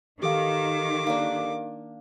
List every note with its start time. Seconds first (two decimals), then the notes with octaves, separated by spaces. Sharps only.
0.22 D#3 G4 A4 F5 D6
1.07 A#3 D4